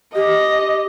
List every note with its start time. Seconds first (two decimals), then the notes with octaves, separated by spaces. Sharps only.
0.15 G4 D#5